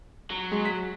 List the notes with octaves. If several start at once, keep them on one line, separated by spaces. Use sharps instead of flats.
F#3
G#3
B6